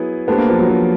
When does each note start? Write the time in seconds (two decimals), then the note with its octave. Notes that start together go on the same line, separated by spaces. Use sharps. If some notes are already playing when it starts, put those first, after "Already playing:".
Already playing: F#3 B3 E4 G#4
0.28 A3 B3 D4 G4 C5
0.38 A#3
0.49 F3
0.59 F#3
0.69 F3